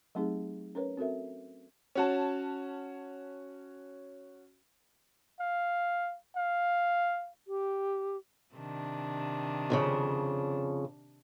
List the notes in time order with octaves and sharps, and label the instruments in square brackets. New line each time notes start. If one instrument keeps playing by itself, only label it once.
[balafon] F#3 A3 C4 D#4 G4 G#4
C#4 A#4 B4 C#5
C4 F#4 A4 A#4 E5
[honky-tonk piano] C#4 F#4 A5
[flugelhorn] F5
F5
[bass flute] G4
[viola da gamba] C3 D#3 D4
[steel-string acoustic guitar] F2 A#2 C#3